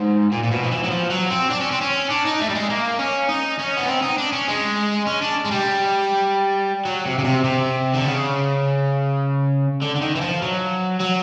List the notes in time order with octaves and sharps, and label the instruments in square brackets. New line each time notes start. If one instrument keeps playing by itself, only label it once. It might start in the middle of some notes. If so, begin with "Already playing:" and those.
Already playing: [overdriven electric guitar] G#2
A#2
A#2
B2
F3
E3
F#3
F3
F#3
C4
D4
C#4
C4
C#4
D4
D#4
A3
G3
G#3
A#3
C#4
D#4
C#4
B3
C4
D#4
D4
C#4
G#3
C#4
D4
G#3
G3
F#3
C3
C#3
C3
C3
D3
C#3
D3
D3
D#3
E3
F3
F#3
F#3